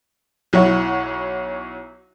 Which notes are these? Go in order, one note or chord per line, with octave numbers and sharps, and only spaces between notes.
B1 F#3 E4 C#5 F#5